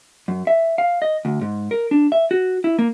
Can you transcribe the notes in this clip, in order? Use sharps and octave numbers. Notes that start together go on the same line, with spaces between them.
F#2
E5
F5
D#5
D2
G#2
A#4
D4
E5
F#4
E4
A#3